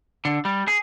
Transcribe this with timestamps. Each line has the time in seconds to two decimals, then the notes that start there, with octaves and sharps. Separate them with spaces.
0.25 D3
0.45 G3
0.68 G#4